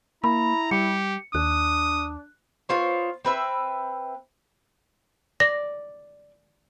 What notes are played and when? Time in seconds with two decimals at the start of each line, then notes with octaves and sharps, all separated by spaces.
0.24 A#3 E4 A#5 B5
0.71 G3 G4 C#7
1.35 D#2 D4 D#6 F#6
2.69 B3 F4 C5 C#5
3.25 C4 B4 E5
5.40 D5 A#6